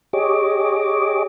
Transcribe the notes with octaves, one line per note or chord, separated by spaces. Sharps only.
G4 G#4 C#5 D#5 D6